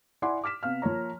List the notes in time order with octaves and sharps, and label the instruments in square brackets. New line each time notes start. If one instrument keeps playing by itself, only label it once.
[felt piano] E4 D5 F#5 G#5 C6 D6
D6 F6 B6 E7
C3 B3 F5 F6
F3 A#3 C#5 A#5